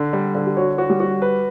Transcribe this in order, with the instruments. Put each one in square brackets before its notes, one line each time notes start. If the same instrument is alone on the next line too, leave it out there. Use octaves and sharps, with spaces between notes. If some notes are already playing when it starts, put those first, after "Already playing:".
Already playing: [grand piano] D3
G3
D3
[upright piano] G4
[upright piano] F#4 [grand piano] C#5
[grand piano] F#4
[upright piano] G3
[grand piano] F#4
B4